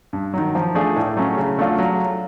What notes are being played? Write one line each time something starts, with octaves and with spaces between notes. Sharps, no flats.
G2
D#3 F#3
F3
A3 D4 F4 G#4
A2
F#3 A3 C#4
C#3
F#3 A3 D4 F4
F#3